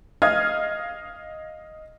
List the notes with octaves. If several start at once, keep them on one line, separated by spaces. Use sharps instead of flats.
D#5 F5 D#6 F6 G#6